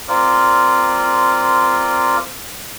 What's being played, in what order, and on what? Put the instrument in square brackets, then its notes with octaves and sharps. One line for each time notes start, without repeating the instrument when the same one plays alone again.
[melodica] C4 F4 A#4 D5